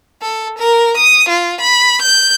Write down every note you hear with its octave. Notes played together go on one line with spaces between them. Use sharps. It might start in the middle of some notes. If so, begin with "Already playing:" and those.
A4
A#4
D#6
F4
B5
G6